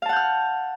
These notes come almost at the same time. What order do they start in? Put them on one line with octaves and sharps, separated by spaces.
F5 A5 F#5 G6 F6